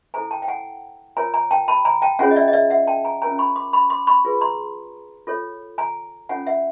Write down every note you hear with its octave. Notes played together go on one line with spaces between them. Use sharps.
E4 A4 C5 G#5 A#5
G5 A5
G5
F#5 G#5
F4 A#4 C#5 G#5 A#5
G#5 A#5
G5 A5
A5 B5
G#5 A#5
G5 A5
C#4 F4 G#4 C#5 F#5 G#5
D#5
D5 E5
D#5
D5 E5
E5 F#5
G5 A5
G#5 A#5
C#4 F4 A#4 C#5 G#5 A#5
B5 C#6
C6 D6
B5 C#6
C6 D6
B5 C#6
F4 G#4 B4
A#5 C6
F4 A4 C#5
G#5 A#5
C#4 F4 A4 C#5 F#5 G#5
E5 F#5